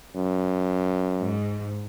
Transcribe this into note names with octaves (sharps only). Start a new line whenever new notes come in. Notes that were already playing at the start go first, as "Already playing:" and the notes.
F#2
G#2